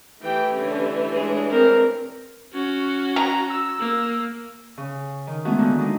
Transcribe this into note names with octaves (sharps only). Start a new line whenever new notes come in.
E3 A3 G4 G#4 G5
D3 G3 C#4
G#3 D4 G#4 C#5
C4 A#4
C#4 F#4
A#5
E6
A#3
C#3
D#3
G#3 A3 B3 C#4 E4 F#4
A#2 D3 D#3
F#3 G#3 D4 D#4